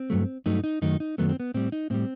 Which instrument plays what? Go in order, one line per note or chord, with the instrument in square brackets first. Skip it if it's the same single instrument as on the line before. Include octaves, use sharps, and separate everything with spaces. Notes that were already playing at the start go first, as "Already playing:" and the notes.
Already playing: [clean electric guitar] C4
G2 F#3 A3
G2 F#3 A3 D#4
D#4
F#2 D#3 F#3 A3 D#4
D#4
F#2 D#3 F#3 A3 B3
C4
B3
A2 G3 C4
D#4
A2 G3 C4